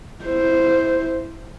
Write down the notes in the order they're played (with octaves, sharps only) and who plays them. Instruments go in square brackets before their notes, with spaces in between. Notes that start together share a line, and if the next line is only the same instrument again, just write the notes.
[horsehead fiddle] E4 C5